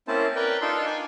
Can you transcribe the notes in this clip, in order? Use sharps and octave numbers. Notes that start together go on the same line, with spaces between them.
A#3 C4 C#4 E4 C5 A5
A#4 B4 D5 G5
D4 D#4 F4 A4 G5 C6
D5 G#5